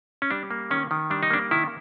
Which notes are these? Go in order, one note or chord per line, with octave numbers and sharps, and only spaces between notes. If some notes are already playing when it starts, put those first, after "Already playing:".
C#4
G3 D4
A#3
D#3 C#4
D#3
G3 D4
D#4
A#3 D4
D#3 E4